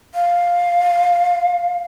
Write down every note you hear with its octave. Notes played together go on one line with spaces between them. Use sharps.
F5